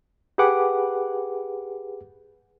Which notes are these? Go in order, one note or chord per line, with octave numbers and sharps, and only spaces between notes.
G4 G#4 B4 F#5 D6